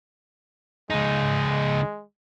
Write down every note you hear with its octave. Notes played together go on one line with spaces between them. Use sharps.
C#2 G#3 D#4